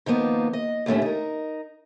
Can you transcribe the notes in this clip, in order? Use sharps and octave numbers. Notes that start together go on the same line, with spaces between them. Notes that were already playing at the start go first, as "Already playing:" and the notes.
D#3 F3 A#3 B3
D#5
D#2 A2 D3 A3 C#4
D#4 A#4